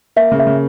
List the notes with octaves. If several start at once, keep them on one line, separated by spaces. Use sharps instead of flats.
A#3 E5
C#3
E5
C#3